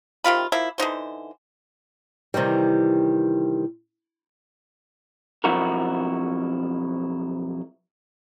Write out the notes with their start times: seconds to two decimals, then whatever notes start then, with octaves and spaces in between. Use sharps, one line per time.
0.24 C3 D#3 F4 B5
0.52 F3 A#3 E4
0.78 D3 E3 D#4 C5
2.34 C3 D#3 E3 G3
5.44 B1 F2 E4 F#4 A#4